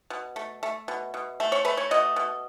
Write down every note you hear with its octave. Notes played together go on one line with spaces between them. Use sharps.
B2
A3
A3
B2
B2
A3
C#5
A3 B4
C#5
B2 D#5
B2